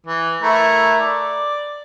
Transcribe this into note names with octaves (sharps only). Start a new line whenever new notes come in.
E3
A3 E4 A#4
D5